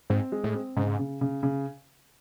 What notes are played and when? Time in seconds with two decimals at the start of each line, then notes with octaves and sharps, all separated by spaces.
0.10 G#2 C4
0.32 G#3
0.44 A2
0.54 C4
0.76 G#2 C#3
0.99 C#3
1.21 C#3
1.43 C#3